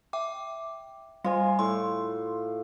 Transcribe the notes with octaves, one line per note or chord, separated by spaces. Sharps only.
E5 G5 D6
G3 F4 C5 G#5
A2 C6